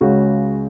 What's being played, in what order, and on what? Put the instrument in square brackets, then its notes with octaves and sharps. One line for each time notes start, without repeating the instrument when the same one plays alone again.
[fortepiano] C#2 C#3 G#3 F#4